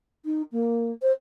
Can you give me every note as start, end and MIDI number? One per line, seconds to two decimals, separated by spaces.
0.25 0.41 63
0.51 0.91 58
1.01 1.12 72